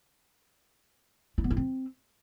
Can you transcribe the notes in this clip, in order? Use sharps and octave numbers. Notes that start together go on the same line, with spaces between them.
E4
B3
E4
C4